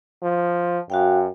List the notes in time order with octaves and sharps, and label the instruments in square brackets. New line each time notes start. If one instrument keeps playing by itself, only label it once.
[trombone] F3
[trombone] F#2 [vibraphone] F#4 F5 G5